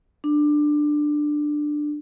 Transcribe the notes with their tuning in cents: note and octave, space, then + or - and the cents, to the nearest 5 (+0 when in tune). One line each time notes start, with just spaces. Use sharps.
D4 +15